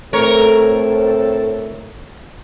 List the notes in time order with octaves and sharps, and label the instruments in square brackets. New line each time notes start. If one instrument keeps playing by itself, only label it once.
[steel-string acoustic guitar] D2 A3 [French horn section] A2 C4 A4 [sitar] A#4 C#5